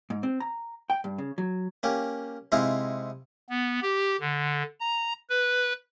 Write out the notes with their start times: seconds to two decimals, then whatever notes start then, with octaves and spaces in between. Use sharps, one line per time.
0.10 G#2
0.23 C4
0.40 A#5
0.90 G5
1.04 G2
1.18 C#3
1.38 F#3
1.83 A#3 C#4 G4
2.52 C3 G#3 D#4 E4 F5
3.49 B3
3.82 G4
4.20 D3
4.80 A#5
5.30 B4